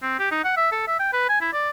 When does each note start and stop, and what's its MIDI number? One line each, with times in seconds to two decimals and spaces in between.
0.02 0.19 60
0.19 0.30 67
0.31 0.44 63
0.44 0.54 78
0.57 0.71 76
0.72 0.86 69
0.88 0.96 76
0.99 1.12 79
1.13 1.29 71
1.29 1.40 80
1.41 1.53 64
1.53 1.70 74